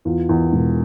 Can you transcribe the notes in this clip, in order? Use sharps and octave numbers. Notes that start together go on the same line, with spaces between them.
E2 F4
E2
E1